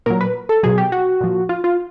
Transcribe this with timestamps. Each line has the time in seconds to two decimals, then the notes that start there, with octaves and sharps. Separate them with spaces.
0.06 A#2 F#3 A#4
0.21 B4
0.49 A4
0.63 B2 F#3 G#4
0.78 G4
0.92 F#4
1.21 A#2 F3
1.49 F4
1.64 F4